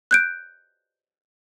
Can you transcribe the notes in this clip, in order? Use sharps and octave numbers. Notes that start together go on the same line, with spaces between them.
F#6 G6 D7